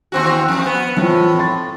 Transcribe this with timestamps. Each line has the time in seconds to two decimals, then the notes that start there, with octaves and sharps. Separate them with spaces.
0.12 D#2 C4 F#4
0.48 F2
0.66 B3
0.97 A2 E3 F3 C4
1.38 C6 A6